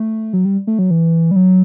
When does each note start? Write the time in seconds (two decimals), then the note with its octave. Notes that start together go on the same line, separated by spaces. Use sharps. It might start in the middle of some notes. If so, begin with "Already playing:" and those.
Already playing: A3
0.33 F#3
0.45 G3
0.67 A3
0.79 F#3
0.91 E3
1.31 G3
1.36 F#3